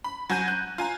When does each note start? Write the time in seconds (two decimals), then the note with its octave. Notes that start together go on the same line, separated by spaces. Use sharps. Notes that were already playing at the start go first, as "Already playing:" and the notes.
0.04 B5
0.30 F#3 F#4 G#5 G6 D#7
0.48 F#6 G6
0.78 F4 G#5 A#5